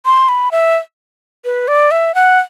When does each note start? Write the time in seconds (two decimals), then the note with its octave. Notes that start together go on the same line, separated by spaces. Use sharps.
0.06 C6
0.29 B5
0.52 E5
1.45 B4
1.68 D5
1.91 E5
2.15 F#5